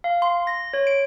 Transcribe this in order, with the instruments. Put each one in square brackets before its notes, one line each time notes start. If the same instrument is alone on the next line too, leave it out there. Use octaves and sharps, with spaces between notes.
[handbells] F5
C6
A#6
C#5
D7